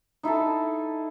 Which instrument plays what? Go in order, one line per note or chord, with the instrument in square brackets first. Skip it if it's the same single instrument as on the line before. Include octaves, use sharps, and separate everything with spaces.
[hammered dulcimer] D#4 E4 G#4 A4